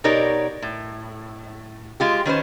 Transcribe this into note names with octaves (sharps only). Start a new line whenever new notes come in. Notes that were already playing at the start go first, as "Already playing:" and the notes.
B2 D#4 G4 A#4 C#5 D5
A2
G#3 F4 G4
D#3 C#4 B4 C5